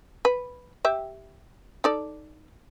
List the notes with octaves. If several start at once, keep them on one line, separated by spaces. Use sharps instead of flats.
B4
G4 E5
D#4 A4 D5